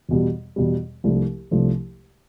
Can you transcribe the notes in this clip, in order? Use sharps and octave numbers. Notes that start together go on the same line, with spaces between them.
E2 B2 G3
E2 B2 G3
C2 C3 F3 A3 D4
C2 C3 F3 A3 D4